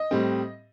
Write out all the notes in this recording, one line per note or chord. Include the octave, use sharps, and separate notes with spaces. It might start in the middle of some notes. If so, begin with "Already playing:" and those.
Already playing: D#5
A2 G3 C4